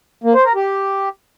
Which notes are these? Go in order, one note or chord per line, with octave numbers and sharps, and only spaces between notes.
A#3
C5
A#4
G4